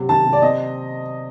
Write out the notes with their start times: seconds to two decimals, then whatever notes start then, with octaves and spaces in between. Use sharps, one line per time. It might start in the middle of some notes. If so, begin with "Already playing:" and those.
Already playing: C3 F#3
0.09 D#3 A5
0.26 C3
0.33 D5
0.42 C4 D#5